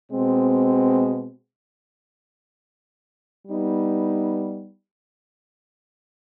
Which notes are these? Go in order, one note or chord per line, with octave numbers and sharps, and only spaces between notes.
B2 G#3 C4
G3 B3 D#4